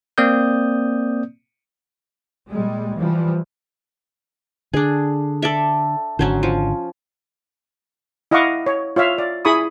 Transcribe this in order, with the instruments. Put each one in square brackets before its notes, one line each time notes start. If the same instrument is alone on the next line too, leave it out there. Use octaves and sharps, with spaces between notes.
[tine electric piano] A#3 C4 D5 D#6 G6
[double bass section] A#2 G3 G#3
E3 F3 G3
[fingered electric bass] D3 [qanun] D4 G#4
[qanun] A4 D5 E5
[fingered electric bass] G#1 D3 [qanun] F#3 C#4 C5
[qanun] F3
[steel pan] E4 D#5 F5 F#5 C#6 D6
C#5
F4 C#5 E5 F5
D5
E4 G#4 B5 C#6 D#6